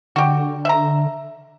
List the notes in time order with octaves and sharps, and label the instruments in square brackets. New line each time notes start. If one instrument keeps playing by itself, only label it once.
[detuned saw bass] D3 [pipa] F#4 G4
[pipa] E5 A#5